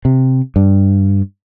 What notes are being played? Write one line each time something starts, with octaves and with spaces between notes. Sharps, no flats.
C3
G2